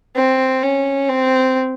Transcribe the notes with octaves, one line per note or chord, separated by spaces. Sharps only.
C4
C#4
C4